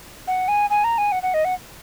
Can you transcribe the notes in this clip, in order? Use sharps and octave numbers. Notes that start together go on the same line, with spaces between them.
F#5
G#5
G#5
A#5
G#5
F#5
F#5
D#5
F#5